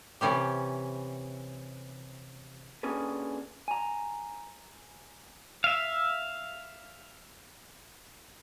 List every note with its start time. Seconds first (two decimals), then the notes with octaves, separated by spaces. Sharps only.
0.21 C3 E3 C#4 G4
2.83 A#3 C#4 D4 G#4 A4 B4
3.68 G#5 A#5
5.64 E5 F5